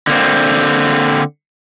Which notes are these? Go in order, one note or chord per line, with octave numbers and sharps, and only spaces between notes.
D3 A#3 C4